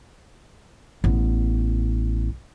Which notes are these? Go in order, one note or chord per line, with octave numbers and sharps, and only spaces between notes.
A1 B3